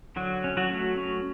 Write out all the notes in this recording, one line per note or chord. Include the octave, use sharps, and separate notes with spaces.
D3 F#3 F#4
C#4
F#3 F#4
A3
C#4